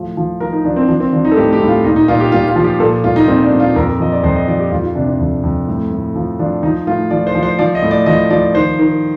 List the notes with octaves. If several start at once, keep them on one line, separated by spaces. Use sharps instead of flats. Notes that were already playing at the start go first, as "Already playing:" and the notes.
Already playing: A2 F3
F3
F3 A#4
D#4
F3 D4
C4
F3 D4
C4
F3 D4
D#4
A4
A2 G4
G4
A2
F4
A#2 D#4
D#4
A#2 F4
G4
A#2 F4
F4
F3
G4
A#2 A4
A#2 F4
D#4
A#2 C4
D4
A#2
F4
F2 A#4
F3 D#5
D5
F2 C5
D#5
F3 D5
G4
F2 F4
F4
C3 D4
D4
F2
F2
A2
A2
F3
F3 D4
F3 D#4
A2 F4
F3 D5
C5
F3
C5
F3 D5
D#5
A2
D5
F3 D#5
F3 D5
D#3 C5
D#3